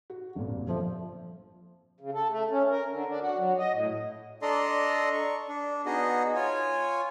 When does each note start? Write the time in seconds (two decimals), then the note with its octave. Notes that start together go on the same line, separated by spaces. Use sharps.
0.10 F#4
0.35 G1 F2 A#2
0.68 F3 A4 E5
2.01 C#3
2.14 A4
2.30 A3
2.51 C#4
2.70 A#4
2.91 D3
3.09 D4
3.21 F#4
3.38 F#3
3.58 D#5
3.72 A2
4.42 D4 A4 D5 D#5 A#5 C6
5.13 C#6
5.49 D4
5.86 B3 D#4 F#4 G#4 D#5
6.35 F4 C#5 G#5